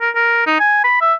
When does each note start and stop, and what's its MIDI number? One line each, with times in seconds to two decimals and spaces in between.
0.01 0.10 70
0.15 0.43 70
0.47 0.55 63
0.60 0.80 80
0.84 0.98 83
1.01 1.14 76